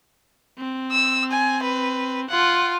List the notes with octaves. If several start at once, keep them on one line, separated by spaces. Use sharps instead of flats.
C4
E6
G#5
B4
F4 F#5